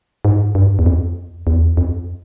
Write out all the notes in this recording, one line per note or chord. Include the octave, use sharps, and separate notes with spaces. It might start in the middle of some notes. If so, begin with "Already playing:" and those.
G#2
G2
E2
F2
E2
F2